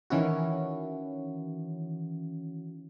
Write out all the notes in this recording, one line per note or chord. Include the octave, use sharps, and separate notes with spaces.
D#3 E3 C#4 E4 F#4